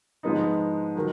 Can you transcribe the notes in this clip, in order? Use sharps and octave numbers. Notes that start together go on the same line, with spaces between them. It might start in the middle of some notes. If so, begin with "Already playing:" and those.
G#2 F3 G#3 B3 D#4
D#3 F#3